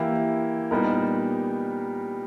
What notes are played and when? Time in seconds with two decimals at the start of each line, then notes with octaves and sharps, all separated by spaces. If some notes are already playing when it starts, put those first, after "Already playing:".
Already playing: E3 A#3 E4 G4
0.71 A#2 G3 B3 D#4 A#4